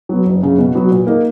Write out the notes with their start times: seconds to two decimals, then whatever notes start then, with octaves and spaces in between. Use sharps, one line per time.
0.09 F#3 B3
0.26 F#1
0.43 F#2 C#3
0.58 B2
0.75 F#3 B3 F#4
0.91 A#2
1.07 A#3 D#4 A#4